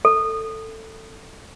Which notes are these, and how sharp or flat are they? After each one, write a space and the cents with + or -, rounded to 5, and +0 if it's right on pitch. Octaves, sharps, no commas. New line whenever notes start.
A4 +15